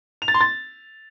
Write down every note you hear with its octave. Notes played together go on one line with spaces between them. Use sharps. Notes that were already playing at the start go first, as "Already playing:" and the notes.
F7
A6
C6
A6